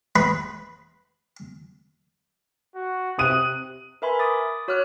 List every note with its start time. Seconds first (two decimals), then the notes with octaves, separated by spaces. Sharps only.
0.16 B4 B5
2.76 F#4
3.19 C3 D#6 F#6 D#7
4.02 A#4 B4 E5 G#5 B5 C6
4.19 D6 D#6 A6
4.68 F#4 C#5 D6 F6 F#6